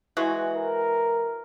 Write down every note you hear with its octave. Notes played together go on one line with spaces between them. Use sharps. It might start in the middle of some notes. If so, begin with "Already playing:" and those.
E3 G#3 F#4
A#4